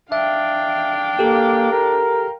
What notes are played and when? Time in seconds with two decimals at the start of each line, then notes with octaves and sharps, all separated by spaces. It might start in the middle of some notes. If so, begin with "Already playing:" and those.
0.12 D4 E5 F5 G5
1.19 A#3 G4 A4
1.72 A#4